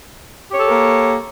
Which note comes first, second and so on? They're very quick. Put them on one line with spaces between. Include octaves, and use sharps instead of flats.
G4 C#5 A4 A#4 A#3